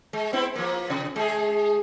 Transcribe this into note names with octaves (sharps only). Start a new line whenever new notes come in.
G#3
B3 C4 E4
F3 A#3
C3
G#3 G#4